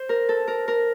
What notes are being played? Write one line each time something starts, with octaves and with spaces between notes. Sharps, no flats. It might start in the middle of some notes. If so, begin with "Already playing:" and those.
Already playing: C5
A#4
A4
A#4
A#4